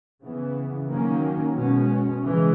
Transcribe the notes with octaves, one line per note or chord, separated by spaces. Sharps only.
C#3 E3 B3
D#3 F#3 A#3 C#4
B2 G#3 C#4
C#3 E3 G#3